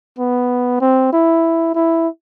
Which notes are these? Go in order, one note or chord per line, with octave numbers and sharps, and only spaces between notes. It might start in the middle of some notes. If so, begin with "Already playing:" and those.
B3
C4
E4
E4